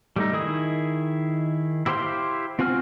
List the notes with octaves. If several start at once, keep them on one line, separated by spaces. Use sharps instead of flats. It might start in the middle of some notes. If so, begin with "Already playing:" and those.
G3 A3 D#4
D#3 E4 G#4 D#6
E4 G4 C5 F5 C6
C4 F4 F#4 G#5 F6